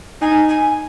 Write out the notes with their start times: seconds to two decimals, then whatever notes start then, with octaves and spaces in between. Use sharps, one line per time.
0.22 D#4 G#5
0.49 G#5